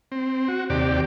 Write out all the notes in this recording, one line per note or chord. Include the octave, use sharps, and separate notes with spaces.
C4
F#4
D#2 C3 G4 D5